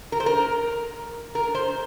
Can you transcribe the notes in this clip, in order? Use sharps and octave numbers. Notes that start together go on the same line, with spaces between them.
A#4
C5
A#4
A#4
C5